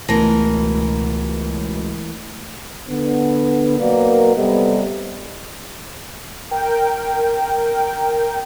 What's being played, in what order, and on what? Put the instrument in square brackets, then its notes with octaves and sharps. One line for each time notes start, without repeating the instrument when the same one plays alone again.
[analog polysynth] C#2 B2 [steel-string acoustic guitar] E3 A#4 [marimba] A3 A#6
[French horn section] D3 B3
B2 F#3 A#3 A#4 B4 D5
C3 G3 B3 A4 D#5
[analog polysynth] A#4 G5